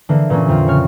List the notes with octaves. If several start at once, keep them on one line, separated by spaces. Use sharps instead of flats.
D3 E3 A#3
A#2 E3 A#3 C#4
F2 F4
C#3 C#5 F6